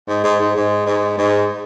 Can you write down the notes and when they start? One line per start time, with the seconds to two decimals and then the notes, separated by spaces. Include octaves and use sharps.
0.08 G#2
0.24 G#2
0.40 G#2
0.55 G#2
0.86 G#2
1.18 G#2